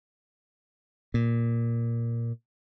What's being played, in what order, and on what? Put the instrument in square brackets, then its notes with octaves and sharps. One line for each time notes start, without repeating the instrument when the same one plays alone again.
[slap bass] A#2